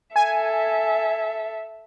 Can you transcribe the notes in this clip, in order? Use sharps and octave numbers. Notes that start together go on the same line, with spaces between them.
A4 E5 G#5